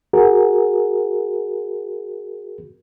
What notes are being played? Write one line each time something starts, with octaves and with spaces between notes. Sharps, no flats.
F#4 G#4 A#4